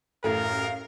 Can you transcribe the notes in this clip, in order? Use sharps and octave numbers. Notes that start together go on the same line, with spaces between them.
A1 F#2 A2 A4 A#4 F5